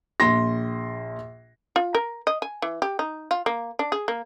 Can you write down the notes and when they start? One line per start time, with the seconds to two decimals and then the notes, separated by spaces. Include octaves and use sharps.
0.20 A#1 C6 A#6
1.76 F4
1.95 A#4
2.27 D#5
2.42 G#5
2.62 E3
2.82 G4
2.99 D#4
3.31 F4
3.46 A#3
3.79 D4
3.92 G#4
4.08 A#3